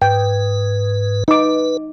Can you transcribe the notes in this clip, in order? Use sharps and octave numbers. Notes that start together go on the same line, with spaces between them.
G#2 B4 G5
D#4 B4 D6